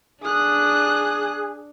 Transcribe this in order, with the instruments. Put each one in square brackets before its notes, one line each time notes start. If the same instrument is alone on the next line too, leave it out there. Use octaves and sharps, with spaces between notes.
[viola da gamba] D4 [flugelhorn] G#4 [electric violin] D#6 F#6